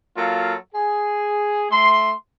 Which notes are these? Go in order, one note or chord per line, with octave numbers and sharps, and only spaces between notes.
F#3 A#3 F4 A4 F5
G#4
A3 C6